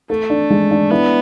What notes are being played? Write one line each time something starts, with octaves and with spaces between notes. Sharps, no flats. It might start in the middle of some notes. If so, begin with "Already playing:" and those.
A3 A4
D4
G#3
D4
B3 E4